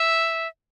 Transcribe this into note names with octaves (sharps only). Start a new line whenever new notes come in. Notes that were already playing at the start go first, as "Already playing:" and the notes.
Already playing: E5